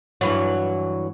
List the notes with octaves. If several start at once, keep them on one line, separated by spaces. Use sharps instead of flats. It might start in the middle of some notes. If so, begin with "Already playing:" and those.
G2 E3 F#3